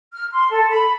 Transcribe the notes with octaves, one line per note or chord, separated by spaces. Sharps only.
F6
C6
A4
B5